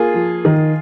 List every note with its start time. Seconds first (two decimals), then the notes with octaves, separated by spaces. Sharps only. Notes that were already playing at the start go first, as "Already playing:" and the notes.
Already playing: A#3 F4 G#4
0.14 F3
0.45 D#3